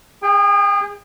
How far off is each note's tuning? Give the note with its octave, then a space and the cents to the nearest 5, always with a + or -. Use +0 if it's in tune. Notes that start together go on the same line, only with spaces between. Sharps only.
G#4 -30 G5 +25